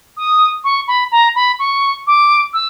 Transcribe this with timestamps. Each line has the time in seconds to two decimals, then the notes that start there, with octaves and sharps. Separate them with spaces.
0.17 D#6
0.64 C#6
0.88 B5
1.12 A#5
1.35 B5
1.59 C#6
2.07 D6
2.54 E6